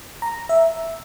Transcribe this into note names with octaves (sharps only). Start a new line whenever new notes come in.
A#5
E5